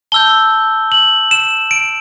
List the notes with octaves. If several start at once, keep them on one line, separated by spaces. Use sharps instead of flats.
A5 E6 G6 G7
F#7
E7
D7